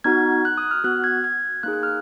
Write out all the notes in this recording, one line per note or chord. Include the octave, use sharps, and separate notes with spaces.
B3 D#4 F#4 G#6
F#6
D#6
F6
B3 F#4 F#6
G#6
G#6
A#3 D#4 G#4 F#6
F#6
F6